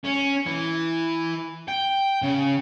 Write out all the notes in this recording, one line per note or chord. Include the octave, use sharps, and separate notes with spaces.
C#4
E3
G5
C#3